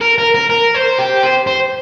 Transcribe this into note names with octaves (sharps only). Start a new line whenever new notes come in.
A#4
A#4
A#4
A#4
C5
G4
C5
C5